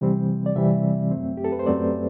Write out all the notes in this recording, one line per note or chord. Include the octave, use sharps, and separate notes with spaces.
C3 E3 G3 C4
D5
C3 E3 G3 C4 E5
F#2 F#3 A3 C4
G4
A4
B4
C5
F#2 F#3 A3 C4 D5